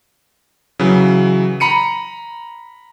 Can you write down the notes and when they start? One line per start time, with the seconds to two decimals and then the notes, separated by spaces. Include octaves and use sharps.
0.79 C#3 E3 F#3
1.60 A#5 B5 C#7 D#7